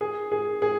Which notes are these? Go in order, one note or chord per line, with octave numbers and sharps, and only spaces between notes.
G#4
G#4
G#4